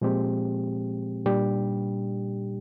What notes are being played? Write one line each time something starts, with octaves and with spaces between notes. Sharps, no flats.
A#2 F3 G#3 C4 G4
A#2 G3 D4 G4